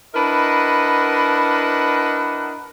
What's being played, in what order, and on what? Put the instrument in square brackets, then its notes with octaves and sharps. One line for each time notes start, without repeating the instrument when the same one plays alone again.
[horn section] D4 E4 A#4 B4 D#5 F#5